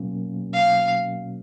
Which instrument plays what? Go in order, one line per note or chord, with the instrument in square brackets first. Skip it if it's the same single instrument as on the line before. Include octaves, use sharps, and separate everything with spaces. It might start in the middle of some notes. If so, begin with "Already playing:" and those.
Already playing: [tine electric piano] B2 F#3 A#3 C#4
[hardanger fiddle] F5